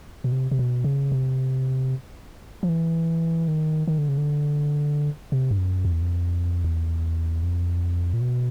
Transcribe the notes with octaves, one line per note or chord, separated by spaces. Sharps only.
B2
C3
C3
B2
C#3
C3
F3
E3
D#3
D#3
D3
C#3
D3
C3
G2
F#2
F2
E2
F2
E2
F2
A#2
B2